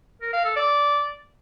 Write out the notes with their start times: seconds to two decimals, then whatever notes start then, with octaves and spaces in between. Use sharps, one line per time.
0.22 A#4
0.33 F5
0.45 A4
0.56 D5